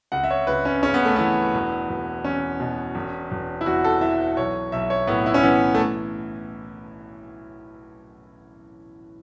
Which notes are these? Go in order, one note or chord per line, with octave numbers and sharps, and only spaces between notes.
C#2 F#5
E5
C#5
C#2 B4
C#4
C#3 C#4
B3
A3
E3 B3
E1
E1
E2 C#4
B2
E1
E1
E4
E2 F#4
A4
E3 E5
B1 C#5
B1 E5
C#5
A2 B3
E4
C#4
E3 B3
A3